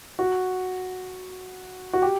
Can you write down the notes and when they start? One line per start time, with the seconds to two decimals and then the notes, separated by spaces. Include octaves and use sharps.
0.19 F#4
1.93 F#4
2.02 G4